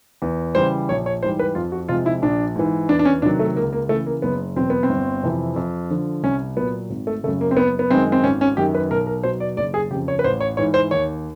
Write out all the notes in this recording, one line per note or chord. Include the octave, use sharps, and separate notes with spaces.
E2
C#3 E3 G3 C5
A#1 C#5
C#5
G#2 E3 G3 C5
B4
F2 F4
F#4
C3 F3 G#3 F4
E4
A#1 D4
G#2 E3
E2 D4
D4
C#4
C3 D#3 F#3 D4
A3
C#2 A#3
A#3
C#3 E3 A3
A#3
F#1 B3
E2 B2 F#3 C4
B3
C4
G1
F2 C3 E3
F2
D3 F3
C2 C#4
A#2 F#3 B3
G#1
A3
F#2 C#3 A3
A#3
C4
F#1 B3
B3
F#2 D#3 G#3 C4
C4
G#1 C#4
C#4
F#2 D#3 G4
B4
B1 A#4
A#4
B2 F#3 C5
D5
F#1 D5
G#4
F2 C#3 G4
C#5
B4
A1 C5
C#5
G#2 E3 C#5
C5
D#2 C#5